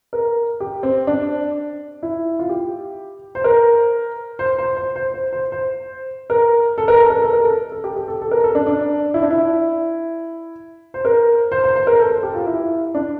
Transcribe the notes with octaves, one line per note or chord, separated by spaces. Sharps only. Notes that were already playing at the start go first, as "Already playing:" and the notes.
A#4
G4
C4
D4
E4
F4
G4
C5
A#4
C5
C5
C5
C5
C5
C5
C5
A#4
A4
A#4
A4
A#4
A4
A#4
A4
A4
G4
G4
A4
A4
A#4
A4
D4
D4
E4
D4
E4
C5
A#4
C5
C5
C5
A#4
A4
A4
G4
F4
E4
D4